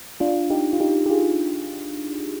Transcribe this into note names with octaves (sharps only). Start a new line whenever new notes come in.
D4 F4
D#4 G4
F4
D#4 G4
G4
F4 G#4